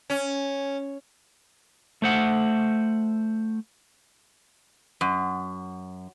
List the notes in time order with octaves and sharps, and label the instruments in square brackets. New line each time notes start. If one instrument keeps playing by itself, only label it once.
[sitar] C#4
[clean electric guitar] A3 C5 F#5
[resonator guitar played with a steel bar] F#2